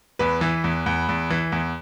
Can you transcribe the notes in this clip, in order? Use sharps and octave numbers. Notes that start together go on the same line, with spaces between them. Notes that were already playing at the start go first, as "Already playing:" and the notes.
E2 B4
E3
E2
E2
E2
E3
E2